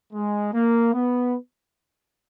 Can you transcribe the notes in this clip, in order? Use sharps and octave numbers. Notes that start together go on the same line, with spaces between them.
G#3
A#3
B3